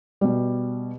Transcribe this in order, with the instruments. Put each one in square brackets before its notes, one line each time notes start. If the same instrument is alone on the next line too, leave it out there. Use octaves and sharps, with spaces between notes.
[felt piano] B2 G3